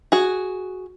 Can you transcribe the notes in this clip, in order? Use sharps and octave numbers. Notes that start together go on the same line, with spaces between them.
F#4 G#4